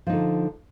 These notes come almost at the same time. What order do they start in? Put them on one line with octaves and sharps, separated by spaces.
F3 D#4 D3